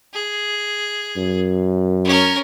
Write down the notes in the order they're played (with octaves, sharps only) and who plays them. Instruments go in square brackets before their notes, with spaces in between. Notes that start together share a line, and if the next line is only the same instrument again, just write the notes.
[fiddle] G#4
[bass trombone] F#2
[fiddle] C#4 A#4